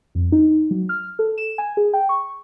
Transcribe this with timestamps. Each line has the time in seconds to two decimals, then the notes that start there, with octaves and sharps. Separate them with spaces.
0.15 F2
0.32 D#4
0.71 F#3
0.89 F6
1.19 A4
1.38 E7
1.58 G#5
1.77 G#4
1.93 G5
2.09 C#6